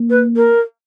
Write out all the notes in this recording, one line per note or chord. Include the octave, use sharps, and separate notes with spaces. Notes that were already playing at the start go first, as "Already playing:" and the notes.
Already playing: A#3
B4
A#4